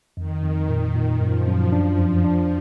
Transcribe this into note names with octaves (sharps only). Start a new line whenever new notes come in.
F2 D#3
F2
A#2
A#2
F#2 F3
F#2
F3 D4
F2
D4